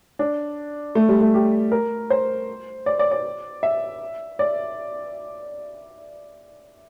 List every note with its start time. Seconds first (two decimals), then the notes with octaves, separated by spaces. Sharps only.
0.19 D4
0.95 A3
1.09 G3
1.21 A3
1.34 G4
1.72 A#4
2.10 C5
2.86 D5
2.99 D5
3.11 D5
3.63 E5
4.39 D5